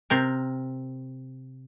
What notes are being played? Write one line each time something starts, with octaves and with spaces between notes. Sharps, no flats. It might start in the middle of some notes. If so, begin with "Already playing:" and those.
C3 C4 A#4